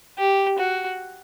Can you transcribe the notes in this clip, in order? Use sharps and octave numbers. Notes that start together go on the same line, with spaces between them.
G4
F#4